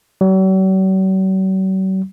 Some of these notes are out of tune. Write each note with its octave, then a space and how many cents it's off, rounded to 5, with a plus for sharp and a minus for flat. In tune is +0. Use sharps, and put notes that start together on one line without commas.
F#3 +45